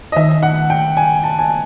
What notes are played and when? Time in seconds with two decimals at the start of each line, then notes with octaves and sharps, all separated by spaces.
0.12 D#5
0.16 D#3 E5
0.43 F#5
0.70 G5
0.97 G#5
1.24 A5
1.39 G#5